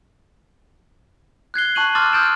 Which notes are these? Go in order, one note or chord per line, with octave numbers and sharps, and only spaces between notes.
F#6 G#6 C7 G7
A5 C#6 F#6 D#7 F#7
A5 C6 D6 E6 F6 A6
D#6 F6 G6 A6 D7 E7